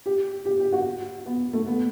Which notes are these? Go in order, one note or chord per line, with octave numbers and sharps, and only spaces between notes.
G4
G4
G4
F#4
B3
A3
B3